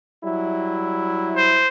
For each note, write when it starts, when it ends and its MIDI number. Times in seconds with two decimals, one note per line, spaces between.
0.23 1.68 54
0.23 1.68 55
0.23 1.68 64
1.37 1.68 72